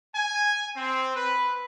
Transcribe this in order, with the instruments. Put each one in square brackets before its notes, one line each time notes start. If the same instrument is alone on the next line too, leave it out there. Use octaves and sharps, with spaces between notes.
[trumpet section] G#5
C4
B4